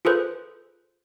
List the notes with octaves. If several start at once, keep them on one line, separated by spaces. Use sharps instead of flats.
F4 G#4 A4 B4 C5